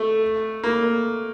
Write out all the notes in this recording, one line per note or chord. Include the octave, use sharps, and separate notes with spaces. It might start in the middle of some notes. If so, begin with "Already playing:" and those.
Already playing: A3
A#3